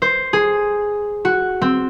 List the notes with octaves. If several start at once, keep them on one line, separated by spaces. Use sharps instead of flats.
C5
G#4
F#4
C4